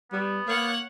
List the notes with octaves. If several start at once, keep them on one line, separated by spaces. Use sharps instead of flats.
G3 B3
A#3 C#5 F#5